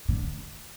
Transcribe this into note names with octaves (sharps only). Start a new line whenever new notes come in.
D3